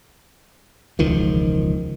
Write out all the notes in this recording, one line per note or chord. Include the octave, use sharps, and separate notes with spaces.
E1 C#2 D#3 F3